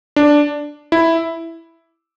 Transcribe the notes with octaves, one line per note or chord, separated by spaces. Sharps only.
D4
E4